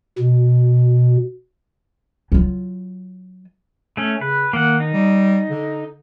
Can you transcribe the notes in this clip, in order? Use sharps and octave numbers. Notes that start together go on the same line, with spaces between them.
B2
F#3 F4
A3 C#4
C#3 B4
D#3 A#3 F#5
D#4
G3
D3